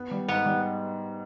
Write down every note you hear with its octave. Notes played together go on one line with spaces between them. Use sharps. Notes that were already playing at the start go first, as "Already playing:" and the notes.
Already playing: B3
G3
G#2 B3
G3